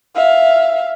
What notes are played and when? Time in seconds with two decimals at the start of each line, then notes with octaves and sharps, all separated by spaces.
0.15 E5 F5